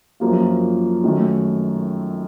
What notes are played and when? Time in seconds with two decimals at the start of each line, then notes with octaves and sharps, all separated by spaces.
0.20 F#2 F3 A#3 F4
1.04 F#2 D#3 A3